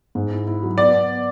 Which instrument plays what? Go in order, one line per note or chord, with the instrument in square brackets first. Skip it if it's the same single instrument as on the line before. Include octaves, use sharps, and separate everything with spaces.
[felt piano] G#2
E4
E4
F#3
[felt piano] B3 [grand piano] D5
[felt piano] B3